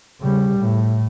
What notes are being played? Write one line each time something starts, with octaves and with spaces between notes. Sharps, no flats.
C#3 G3
A2